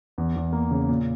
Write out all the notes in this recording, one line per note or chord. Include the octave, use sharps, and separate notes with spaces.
E2
E2
A#3
C#3
A#2